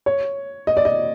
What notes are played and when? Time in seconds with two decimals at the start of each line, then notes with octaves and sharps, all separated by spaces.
0.06 C#5
0.67 D#5
0.77 D5
0.85 D#5